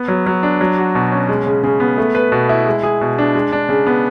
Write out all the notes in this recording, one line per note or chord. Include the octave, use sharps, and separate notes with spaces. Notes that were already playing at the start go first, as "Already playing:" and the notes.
Already playing: B3
F#3
F#3
D4
F#3
F#4
B2
C#4
G#3
C#3
C#3
B3
A3
B4
B2
E4
G#3
G#4
B2
D4
G#3
D4
C#3
B3